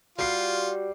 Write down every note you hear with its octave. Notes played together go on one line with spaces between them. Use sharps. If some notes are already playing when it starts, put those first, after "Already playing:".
G3 F4 F#4 C7